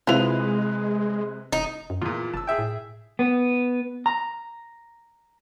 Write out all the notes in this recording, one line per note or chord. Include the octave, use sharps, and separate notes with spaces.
C3 G#3 E4 F4 B4 F7
E1 D#4
F#2
E2 A#2 F4
F#1 A5 E6
G#4 E5 G5
A2
B3
A#5